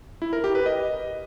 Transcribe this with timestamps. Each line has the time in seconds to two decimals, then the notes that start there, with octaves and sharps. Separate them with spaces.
0.22 E4
0.33 A#4
0.44 G4
0.55 B4
0.66 D#5